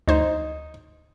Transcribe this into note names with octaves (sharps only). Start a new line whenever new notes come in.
D2 D#4 C5